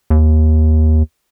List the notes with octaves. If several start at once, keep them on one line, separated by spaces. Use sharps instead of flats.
D#2